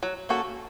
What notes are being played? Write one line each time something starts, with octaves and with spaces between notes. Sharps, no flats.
F#3
A#3 C#4 F#4 A4